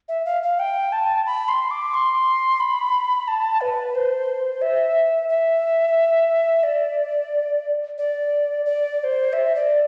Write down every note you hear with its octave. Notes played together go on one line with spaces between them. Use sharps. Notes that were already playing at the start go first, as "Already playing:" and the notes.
E5
F5
F5
G5
A5
B5
C6
D6
C6
B5
A5
B4
C5
E5
E5
D5
D5
D5
D5
C5
E5
D5